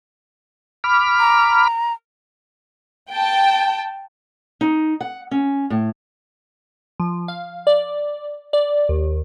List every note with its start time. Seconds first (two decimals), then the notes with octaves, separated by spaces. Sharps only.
0.84 B5 D6 F6
1.19 A#5
3.11 G5 A5
4.61 D#4
5.01 F#5
5.31 C#4
5.70 A2
7.00 F3
7.28 F5
7.67 D5
8.53 D5
8.89 D#2